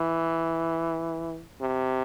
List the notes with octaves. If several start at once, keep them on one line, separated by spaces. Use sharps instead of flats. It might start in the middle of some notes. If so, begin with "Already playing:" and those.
Already playing: E3
C3